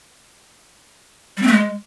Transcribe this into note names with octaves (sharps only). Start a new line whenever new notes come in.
G3
C4
A3
G#3